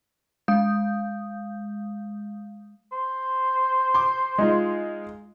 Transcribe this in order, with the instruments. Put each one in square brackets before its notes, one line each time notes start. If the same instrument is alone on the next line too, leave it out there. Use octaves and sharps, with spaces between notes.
[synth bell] G#3 F5 D#6 G6
[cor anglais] C5
[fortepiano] C6 D6
G#3 D#4 F4